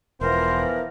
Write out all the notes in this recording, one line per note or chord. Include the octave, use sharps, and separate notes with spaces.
E1 E3 F3 B3 A#4 C5